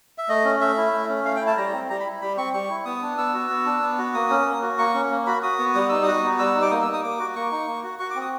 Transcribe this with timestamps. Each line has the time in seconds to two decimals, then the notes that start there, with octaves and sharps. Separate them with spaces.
0.18 E5
0.28 A3 D#5
0.45 C#4
0.61 A3 E5
0.77 E4
0.93 A3
1.09 C#4
1.25 A3 F5
1.36 G5
1.41 E4
1.47 A5
1.57 G3 A#5
1.73 C4
1.89 G3 A#5
2.00 B5
2.05 E4
2.21 G3 B5
2.37 C4 C#6
2.53 G3 C#6
2.69 E4
2.85 B3 D#6
3.02 D4
3.18 B3 E6
3.34 F#4
3.50 B3
3.66 D4
3.82 B3
3.98 F#4
4.14 A#3 D#6
4.30 C#4
4.46 A#3
4.62 F#4
4.79 A#3 C#6
4.94 C#4
5.11 A#3
5.27 F#4 B5
5.43 F#4 D#6
5.59 B3
5.75 G3 D#6
5.89 D#4 E6
6.03 F#4 D#6
6.23 B3
6.39 G3 E6
6.55 D#4
6.62 D6
6.71 A#3 D#6
6.82 E6
6.87 D#4
6.93 D#6
7.03 A#3 D6
7.19 F#4
7.35 A#3 C#6
7.51 D#4
7.68 A#3
7.84 F#4
8.00 F#4 C#6
8.11 D6
8.16 C4
8.21 D#6